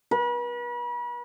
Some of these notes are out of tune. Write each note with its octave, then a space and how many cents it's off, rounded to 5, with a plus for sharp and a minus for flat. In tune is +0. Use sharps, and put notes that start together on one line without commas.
B4 -40